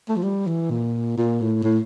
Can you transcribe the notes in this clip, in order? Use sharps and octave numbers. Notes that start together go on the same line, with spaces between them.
A3
F3
G3
E3
A#2
A#2
A2
A2